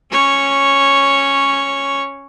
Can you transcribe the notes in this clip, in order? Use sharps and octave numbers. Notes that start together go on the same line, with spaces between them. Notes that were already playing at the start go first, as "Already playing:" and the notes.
C#4 C#5